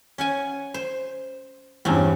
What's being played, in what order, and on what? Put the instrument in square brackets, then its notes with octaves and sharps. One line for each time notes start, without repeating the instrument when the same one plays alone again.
[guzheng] C#4 F#5 G#5
C5
[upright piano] E2 G2 [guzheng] C4 C#4